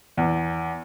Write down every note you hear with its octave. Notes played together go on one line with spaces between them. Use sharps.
E2